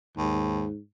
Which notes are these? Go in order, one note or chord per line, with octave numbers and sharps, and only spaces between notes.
D#2 G#2